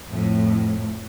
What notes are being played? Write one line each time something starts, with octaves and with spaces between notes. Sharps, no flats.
F2 A2